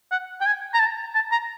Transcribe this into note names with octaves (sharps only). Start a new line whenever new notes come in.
F#5
G5
G#5
A#5
A5
A5
A#5